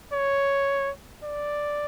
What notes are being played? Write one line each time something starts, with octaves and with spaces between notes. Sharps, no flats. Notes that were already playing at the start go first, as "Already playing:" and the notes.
C#5
D5